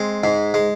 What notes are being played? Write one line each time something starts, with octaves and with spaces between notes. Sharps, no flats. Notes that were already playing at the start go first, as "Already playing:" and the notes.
Already playing: G#3 C4
G#2
G#3